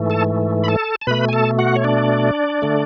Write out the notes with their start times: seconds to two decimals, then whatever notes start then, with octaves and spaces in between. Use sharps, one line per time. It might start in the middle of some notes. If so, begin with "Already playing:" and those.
Already playing: G#2 E3 A3
0.10 A4 A5
0.64 B5
0.68 A4 A5
1.01 A5
1.07 B2 A3 B4 B5
1.28 G#5
1.33 A4 A5
1.59 F#4 F#5
1.76 C#5
1.84 D4 D5
2.62 D3 A3